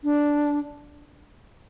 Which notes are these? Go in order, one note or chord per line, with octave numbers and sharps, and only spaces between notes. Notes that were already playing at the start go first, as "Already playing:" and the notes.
D4